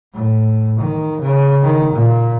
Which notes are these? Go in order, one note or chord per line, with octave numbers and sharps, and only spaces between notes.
A2
D#3
C#3
D#3
A#2